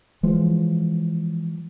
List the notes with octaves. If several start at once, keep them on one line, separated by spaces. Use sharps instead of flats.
E3 F3 G#3